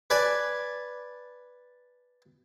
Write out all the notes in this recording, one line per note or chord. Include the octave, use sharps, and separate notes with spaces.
B4 D5 G#5 A5